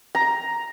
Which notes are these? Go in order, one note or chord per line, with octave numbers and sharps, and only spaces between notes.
A#5